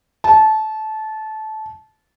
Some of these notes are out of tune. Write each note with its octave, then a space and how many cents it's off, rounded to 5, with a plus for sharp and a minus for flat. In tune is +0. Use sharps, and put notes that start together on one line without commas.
A5 -20